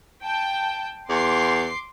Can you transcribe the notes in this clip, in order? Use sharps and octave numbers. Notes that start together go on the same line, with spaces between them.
G5 A5
E2 C6 D6 C7